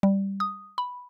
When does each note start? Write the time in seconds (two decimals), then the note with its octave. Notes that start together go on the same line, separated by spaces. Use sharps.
0.03 G3
0.40 D#6
0.78 B5